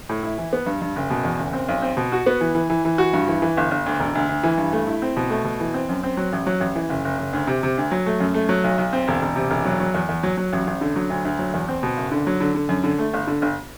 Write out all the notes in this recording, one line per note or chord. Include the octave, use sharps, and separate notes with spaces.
A2
E4
E3
B3
G2
G2
F#1
B2
E2
F#1
C4
B1
C4
B2
F#4
B3
E3
E3
E3
E3
F#4
G2
E3
E3
G1
G1
D2
E1
D2
D2
E3
G2
A3
E4
C4
B2
A3
B2
E3
C4
F#2
C4
F#3
A1
F#3
A1
E3
F#1
F#1
F#1
D2
C3
C3
D2
F#3
A3
F#2
A3
F#3
B1
B1
C4
E1
E1
C3
E1
F#3
F#3
E2
E2
F#3
F#3
A1
A1
D3
F#3
D2
D2
F#3
E2
C4
B2
F#1
D3
F#3
D3
D3
F#2
D3
A3
G1
D3
G1